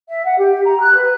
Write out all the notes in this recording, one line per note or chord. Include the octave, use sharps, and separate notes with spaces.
E5
F#5
G4
A#5
F#6
B4